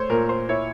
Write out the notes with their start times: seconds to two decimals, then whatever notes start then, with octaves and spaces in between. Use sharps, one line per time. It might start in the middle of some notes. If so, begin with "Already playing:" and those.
Already playing: A3 C5 C#5
0.09 A#2 A#4
0.29 C5
0.49 E4 C#5